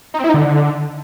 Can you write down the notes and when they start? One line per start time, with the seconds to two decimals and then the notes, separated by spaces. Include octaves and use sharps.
0.14 D#4
0.19 C4
0.24 E4
0.29 D#4
0.34 D3